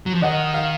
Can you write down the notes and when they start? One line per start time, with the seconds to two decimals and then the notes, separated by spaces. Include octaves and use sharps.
0.06 F#3
0.14 F3
0.22 D#3 D#5 F#5
0.54 F5